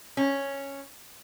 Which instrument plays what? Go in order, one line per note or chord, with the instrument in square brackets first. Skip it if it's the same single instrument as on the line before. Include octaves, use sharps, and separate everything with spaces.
[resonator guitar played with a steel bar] C#4